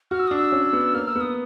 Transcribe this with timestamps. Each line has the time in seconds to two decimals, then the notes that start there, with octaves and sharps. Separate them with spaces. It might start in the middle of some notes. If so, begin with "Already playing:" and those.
0.11 F#4 F6
0.19 E6
0.28 D4 D#6
0.36 E6
0.52 C#4
0.73 B3
0.94 A#3 F6
1.07 E6
1.16 B3
1.21 D#6